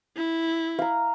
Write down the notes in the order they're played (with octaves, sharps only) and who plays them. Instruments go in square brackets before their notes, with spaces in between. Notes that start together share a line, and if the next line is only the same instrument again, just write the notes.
[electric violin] E4
[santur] F5 A#5